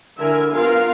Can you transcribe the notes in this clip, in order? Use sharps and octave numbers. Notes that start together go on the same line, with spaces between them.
D3 E4 A#4 E5 G#5
B3 F4 A#4 F5